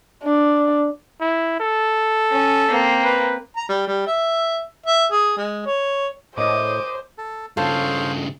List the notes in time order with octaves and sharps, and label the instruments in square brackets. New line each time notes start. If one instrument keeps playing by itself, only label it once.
[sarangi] D4
[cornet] E4
A4
[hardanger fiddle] C#4
A#3 C4
[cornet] B4
[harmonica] A#5
G3
G3
E5
E5
G#4
G#3
C#5
[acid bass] A2 [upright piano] A#4 C#5 D#5 [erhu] C5 [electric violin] D6 D#6
[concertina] A4
[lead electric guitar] G2 C#3 [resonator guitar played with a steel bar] F4 A4 [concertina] C5 C#5 F5